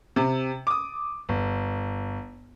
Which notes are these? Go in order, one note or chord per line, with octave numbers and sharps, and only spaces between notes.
C3
D6 D#6
G1